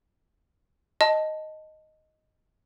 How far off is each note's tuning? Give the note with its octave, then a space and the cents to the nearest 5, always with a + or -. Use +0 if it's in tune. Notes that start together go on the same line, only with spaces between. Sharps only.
D#5 +0 A5 +0